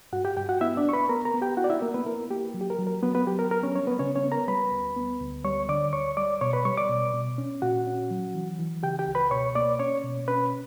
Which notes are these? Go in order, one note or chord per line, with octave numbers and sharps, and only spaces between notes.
G2 F#4 F#5
G4 G5
G2 G4 G5
F#4 F#5
B3 E4 E5
D4 D5
B3 C#6
B4 B5
B3 A#4 A#5
A#4 A#5
B3
G4 G5
E4 F#4 F#5
D5
E4 E5
A#3 A#4
B3 B4
E4 A#4
A#3 G4
F#3
G4
A#4
F#3
A#4
F#3 B3 B4
B3 B4
F#3 G4
A#4
B3 A#4
C#4 C#5
G3 C#4 C#5
B3 B4
C#3 C#4 C#5
C#4 C#5
B3
A#4 A#5
G3 B4 B5
D2
B3
D2
G3 C#5 C#6
D3 D5 D6
D2 C#5 C#6
G3 D5 D6
B2 C#5 C#6
B4 B5
G3 C#5 C#6
D5 D6
B2
B2
C#4
A#2 F#4 F#5
C#4
F#3
E3
E3
C#3 G4 G5
G4 G5
C#2
B4 B5
B2 C#5 C#6
A#3 D5 D6
C#4 C#5 C#6
B2
C#4 B4 B5